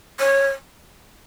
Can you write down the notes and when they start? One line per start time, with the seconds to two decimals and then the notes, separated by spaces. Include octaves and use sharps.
0.20 C#5